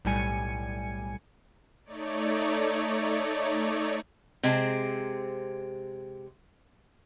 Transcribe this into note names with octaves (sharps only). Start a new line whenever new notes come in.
B1 A2 G3 G#5 C#7
A3 D#4 C#5 D5
C3 G#3 C4